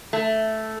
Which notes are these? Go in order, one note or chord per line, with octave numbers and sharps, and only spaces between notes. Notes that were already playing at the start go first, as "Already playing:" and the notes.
A3